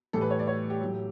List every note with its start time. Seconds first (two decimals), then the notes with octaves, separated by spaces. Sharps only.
0.13 A2 E3 G3 A4
0.21 B4
0.30 C#5
0.39 D5
0.47 C#5
0.70 G4
0.80 A2 F#3